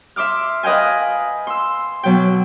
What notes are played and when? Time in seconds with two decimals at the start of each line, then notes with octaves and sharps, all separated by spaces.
0.16 E5 C6 D6 F6
0.63 B4 D#5 F5 G5 G#5
1.47 C6 E6
2.03 B2 F#3 G5